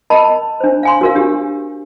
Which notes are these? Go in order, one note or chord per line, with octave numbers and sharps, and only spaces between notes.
A#4 D#5 A5 B5
D4 C5
F5 G#5 C6
F#4 A#4 F5
D4 G4